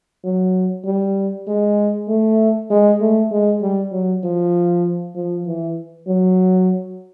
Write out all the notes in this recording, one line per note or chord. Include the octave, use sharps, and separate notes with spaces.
F#3
G3
G#3
A3
G#3
A3
G#3
G3
F#3
F3
F3
E3
F#3